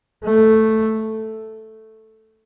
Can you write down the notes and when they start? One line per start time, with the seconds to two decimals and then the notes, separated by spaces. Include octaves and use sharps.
0.25 A3